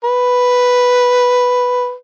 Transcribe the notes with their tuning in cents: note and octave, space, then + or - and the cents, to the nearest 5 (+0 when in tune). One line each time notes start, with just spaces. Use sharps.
B4 +0